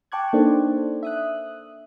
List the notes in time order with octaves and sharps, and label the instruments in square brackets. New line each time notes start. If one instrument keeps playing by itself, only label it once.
[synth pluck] G5 A5 C#6 D6 F#6 G#6
A#3 D4 D#4 A4 C5 D5
E5 D#6 F#6